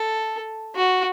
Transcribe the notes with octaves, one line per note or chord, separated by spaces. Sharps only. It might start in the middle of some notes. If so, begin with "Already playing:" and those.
Already playing: A4
F#4